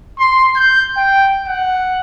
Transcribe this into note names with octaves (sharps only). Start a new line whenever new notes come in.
C6
G6
G5
F#5